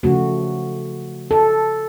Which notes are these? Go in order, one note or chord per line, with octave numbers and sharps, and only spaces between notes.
C#3 F3 A3 F#4
A4